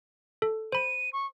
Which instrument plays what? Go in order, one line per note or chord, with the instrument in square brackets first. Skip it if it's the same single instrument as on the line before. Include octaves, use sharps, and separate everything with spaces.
[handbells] A4
[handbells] C5 B5 [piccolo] D#7
[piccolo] C#6